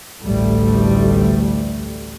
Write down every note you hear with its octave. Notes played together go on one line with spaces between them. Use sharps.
A1 D2 G3 A3